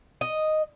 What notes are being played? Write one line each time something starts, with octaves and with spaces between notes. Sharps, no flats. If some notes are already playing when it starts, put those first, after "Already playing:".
D#5